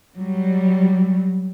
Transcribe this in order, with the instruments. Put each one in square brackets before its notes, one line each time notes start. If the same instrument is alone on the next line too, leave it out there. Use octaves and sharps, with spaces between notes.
[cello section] F#3 G3